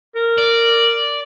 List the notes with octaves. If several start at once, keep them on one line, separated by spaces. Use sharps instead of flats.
A#4
D5